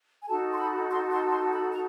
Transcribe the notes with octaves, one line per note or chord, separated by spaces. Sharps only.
G#5
D#4 F#4 A4 A5
C6
B5
C6
C6
C6
B5
A#5